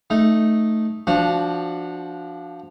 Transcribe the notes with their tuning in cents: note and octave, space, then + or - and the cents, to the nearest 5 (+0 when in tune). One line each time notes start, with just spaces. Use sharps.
A3 +0 D#4 +0
F3 -10 D4 +0 F#4 -20